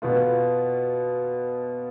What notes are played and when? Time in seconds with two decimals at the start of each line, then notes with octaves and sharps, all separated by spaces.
0.02 B2 B3 F4